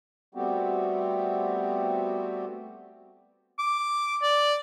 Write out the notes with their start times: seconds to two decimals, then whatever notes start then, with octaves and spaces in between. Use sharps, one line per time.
0.35 G3 A3 B3 C4 F#4 G4
3.59 D6
4.22 D5